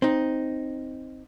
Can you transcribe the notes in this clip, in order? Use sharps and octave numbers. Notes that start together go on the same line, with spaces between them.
C4 D#4